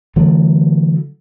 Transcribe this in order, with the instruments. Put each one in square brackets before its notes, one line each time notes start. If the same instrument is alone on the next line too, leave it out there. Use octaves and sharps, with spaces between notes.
[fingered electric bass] D3 E3 F#3 A3